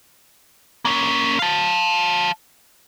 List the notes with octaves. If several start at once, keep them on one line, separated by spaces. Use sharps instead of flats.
A#3 C#4
F5 A5